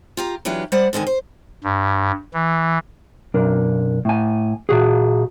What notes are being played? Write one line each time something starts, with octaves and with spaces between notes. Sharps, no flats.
F4 G4 A#5
E3 F#3 D4 F4 G4
G3 C5 D5 F#5
G#2 D3 D#3 G#5
C5
G2
E3
B1 F#2 D4 A#4
A2 G#5
A#2 F#4 G#4